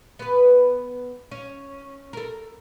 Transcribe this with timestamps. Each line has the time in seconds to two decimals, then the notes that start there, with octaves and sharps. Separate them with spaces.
0.19 B3 B4
1.31 C#4
2.13 A4 A#4